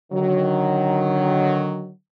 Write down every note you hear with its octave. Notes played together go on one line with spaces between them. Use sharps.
D3 D#3 F#3